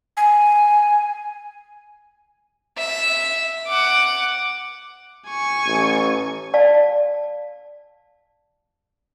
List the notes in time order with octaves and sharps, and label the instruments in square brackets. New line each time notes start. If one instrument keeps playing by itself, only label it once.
[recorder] G#5
[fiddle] E5
F#5 D6
[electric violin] G#5 C#6
[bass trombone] A1
[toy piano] D5 F5 A5